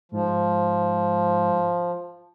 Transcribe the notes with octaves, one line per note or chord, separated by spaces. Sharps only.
G#2 F3